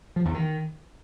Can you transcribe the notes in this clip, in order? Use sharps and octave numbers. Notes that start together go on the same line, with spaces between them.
F3
E2
D#3